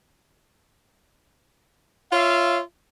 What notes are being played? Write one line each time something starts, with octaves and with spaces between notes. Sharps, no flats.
F4 C#5 E5 F5